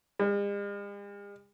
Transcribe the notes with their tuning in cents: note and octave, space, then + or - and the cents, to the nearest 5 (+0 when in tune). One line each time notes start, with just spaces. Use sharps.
G#3 -45